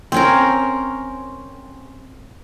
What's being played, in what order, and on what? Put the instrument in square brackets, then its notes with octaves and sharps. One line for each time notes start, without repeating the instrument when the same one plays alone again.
[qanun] C4 C#4 A#4